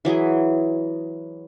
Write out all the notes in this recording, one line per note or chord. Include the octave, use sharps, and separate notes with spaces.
E3 F#3 E4 G#4